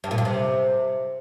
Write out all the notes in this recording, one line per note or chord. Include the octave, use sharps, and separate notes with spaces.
G2
A#2
G2
C3